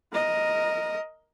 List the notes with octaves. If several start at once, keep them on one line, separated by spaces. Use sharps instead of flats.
A#4 D#5